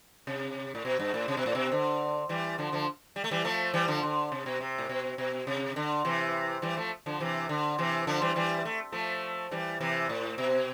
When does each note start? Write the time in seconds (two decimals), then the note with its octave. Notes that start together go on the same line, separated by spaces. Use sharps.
0.27 C3
0.75 A2
0.85 B2
0.99 G2
1.14 A2
1.28 C3
1.37 B2
1.46 A2
1.55 B2
1.72 D3
2.29 E3 G3
2.58 D3 F3
2.72 D3 F3
3.16 G3
3.24 A3
3.31 E3 G3
3.44 F3 A3
3.74 E3 G3
3.88 D3 F3
4.03 D3
4.32 C3
4.46 B2
4.61 C3
4.78 A2
4.89 B2
5.18 B2
5.47 C3
5.76 D3
6.05 C3 E3
6.62 E3 G3
6.77 F3 A3
7.06 D3 F3
7.20 C3 E3
7.49 D3
7.78 C3 E3
8.07 D3 F3
8.21 E3 G3
8.36 E3 G3
8.65 A3
8.92 F3 A3
9.51 E3 G3
9.81 C3 E3
10.09 A2
10.38 B2